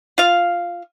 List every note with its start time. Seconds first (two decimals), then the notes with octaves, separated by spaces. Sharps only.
0.18 F4 F5